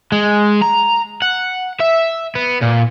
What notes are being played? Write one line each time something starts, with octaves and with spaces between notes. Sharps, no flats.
G#3
A#5
F#5
E5
B3
A#2